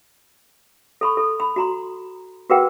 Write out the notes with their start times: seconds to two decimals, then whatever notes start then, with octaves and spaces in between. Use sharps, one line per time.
1.01 A4 B5 C#6
1.17 A4
1.40 B5
1.56 F#4 A#5 C6
2.50 F#4 G#4 A#4 B4 F#5 G5